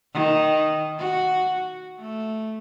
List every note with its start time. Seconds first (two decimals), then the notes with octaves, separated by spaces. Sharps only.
0.14 D#3
0.99 F#4
2.00 A3